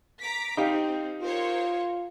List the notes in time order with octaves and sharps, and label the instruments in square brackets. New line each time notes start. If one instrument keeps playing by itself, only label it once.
[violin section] A#5 D6 B6
[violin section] C4 [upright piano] D#4 G4 F5
[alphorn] F4 [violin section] A#4 C5 C#5